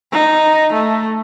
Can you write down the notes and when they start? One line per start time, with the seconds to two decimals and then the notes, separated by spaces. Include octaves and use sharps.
0.12 D#4
0.73 A3